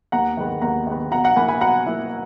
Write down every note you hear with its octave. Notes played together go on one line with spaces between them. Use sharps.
D#2 F#5 A#5
D#3 G#3 B3
D#2 F#5 A#5
D#3 G#3 B3
B2 F#5 A#5
F#5 A#5
A#3 G#5 B5
E4
G#5 B5
B2 F#5 A#5
A#3 E4